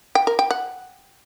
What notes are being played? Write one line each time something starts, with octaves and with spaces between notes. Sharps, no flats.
G5
A#4
G5
F#5